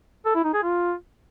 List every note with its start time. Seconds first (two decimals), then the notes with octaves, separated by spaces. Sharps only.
0.25 A4
0.35 E4
0.44 D#4
0.54 G#4
0.63 F4